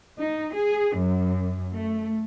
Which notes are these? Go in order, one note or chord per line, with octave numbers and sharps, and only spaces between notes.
D#4
G#4
F#2
A3